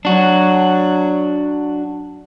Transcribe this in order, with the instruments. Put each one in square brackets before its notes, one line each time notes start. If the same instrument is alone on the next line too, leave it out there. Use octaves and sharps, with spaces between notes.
[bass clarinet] F#3 [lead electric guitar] D4 F#4